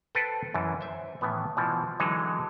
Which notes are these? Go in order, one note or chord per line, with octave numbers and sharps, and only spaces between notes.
A4 B4 C5 G5 A5
F#2 E3
C5 E5
A2 D#3 E3 B3
B2 E3 F3
D3 E3 F#3 G#3 D#4